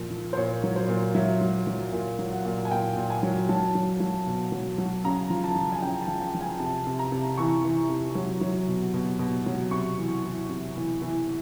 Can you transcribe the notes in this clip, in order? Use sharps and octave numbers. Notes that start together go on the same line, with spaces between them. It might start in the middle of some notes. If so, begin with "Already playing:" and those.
Already playing: A#2 F3
F3
C5
A#2 C#5
F#3
C5
A#2
F#3 E5
F#3
F#3
A#2 F5
F#3
F#5
A#2
G#5
A#2 G5
A#2
G#5
F#3
F#3 A5
F#3
F#3
B2
F#3
F#3
C#3 A#5
F3
A5
F3
G#5
C#3 G5
A5
F3
G5
F3
G#5
C3 A5
C3
A#5
C3
E3 C#6
E3
C3
F#3
F#3
B2
B2
B2
F#3
C3 C#6
E3
E3
C3
E3
E3